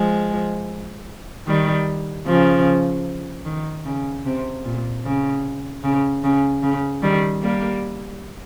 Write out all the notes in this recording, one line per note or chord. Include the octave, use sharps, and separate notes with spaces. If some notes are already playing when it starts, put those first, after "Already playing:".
Already playing: F3 G#3
D#3 G3
C#3 F3
D#3
C#3
C3
A#2
C#3
C#3
C#3
C#3
D#3 G3
G3 A#3